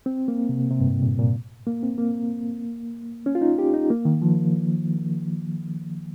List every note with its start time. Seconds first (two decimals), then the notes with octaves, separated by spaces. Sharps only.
0.06 C4
0.28 A#3
0.49 C3
0.71 C3
0.80 G2
0.87 G#2
1.03 A#2
1.19 A#2
1.67 A#3
1.83 C4
1.98 A#3
3.26 C#4
3.35 F4
3.41 D#4
3.59 G4
3.74 D#4
3.90 A#3
4.05 D#3
4.22 F3